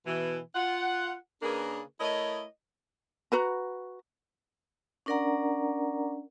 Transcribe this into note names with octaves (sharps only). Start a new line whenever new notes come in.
B2 E3
F4 F#5
C#3 A#3 D4 G#4 A#4 B4
A3 E4 A#4 C#5 D#5
F#4 B4 A#5
C#4 D4 A#4 D5 F#5 A#5